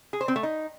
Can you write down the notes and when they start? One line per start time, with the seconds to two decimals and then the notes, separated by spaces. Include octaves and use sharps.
0.13 G#4
0.21 C5
0.28 C4
0.36 A3
0.43 D#4